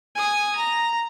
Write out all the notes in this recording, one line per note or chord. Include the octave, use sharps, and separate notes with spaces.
G#5 D#6
A#5